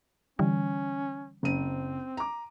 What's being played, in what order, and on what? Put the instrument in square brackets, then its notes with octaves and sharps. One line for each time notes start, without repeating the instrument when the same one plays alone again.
[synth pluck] D3 E3 G3 [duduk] C#4
[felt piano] F#1 D#7 [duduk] C4
[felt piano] A#5 D6